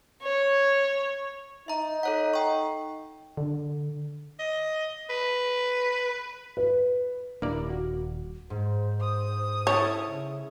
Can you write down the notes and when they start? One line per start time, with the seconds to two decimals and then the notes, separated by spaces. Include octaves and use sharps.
0.22 C#5
1.68 D#4 E5 A#5
2.03 A4 C#5 F#5
2.33 G5 C#6
3.37 D3
4.39 D#5
5.10 B4
6.57 B4
7.42 D#1 A#3 D4 E4 G4 D5
7.70 F#4
8.50 G#2 C5
9.01 D#6
9.67 C#4 E4 A4 C#5
10.06 C#3